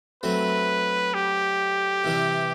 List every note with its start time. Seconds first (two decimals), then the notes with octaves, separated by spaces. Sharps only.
0.23 F#3 A3 C4 B4
1.14 G4
2.04 C3 E3 G3